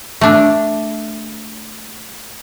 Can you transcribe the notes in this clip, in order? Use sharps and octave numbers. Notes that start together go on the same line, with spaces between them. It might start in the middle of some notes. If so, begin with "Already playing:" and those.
A3 D4